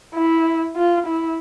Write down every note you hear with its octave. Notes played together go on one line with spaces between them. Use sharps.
E4
F4
E4